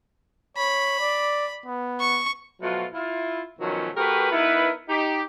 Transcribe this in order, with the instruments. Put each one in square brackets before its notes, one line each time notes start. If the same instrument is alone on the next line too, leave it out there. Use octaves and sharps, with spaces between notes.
[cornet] C#5 [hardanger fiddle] B5
[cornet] D5
B3
[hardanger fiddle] C#6
[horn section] B2 F3 F#3 A3 F4
E4 F4
B2 D#3 F3 F#3 A3 C#4
A3 F#4 G4 A#4 B4
B3 D#4 E4 A#4 B4
D#4 G4